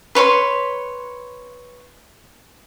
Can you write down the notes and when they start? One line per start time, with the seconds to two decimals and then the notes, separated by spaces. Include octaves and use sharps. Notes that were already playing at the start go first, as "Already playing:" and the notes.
0.15 B4 C#5 B5 C6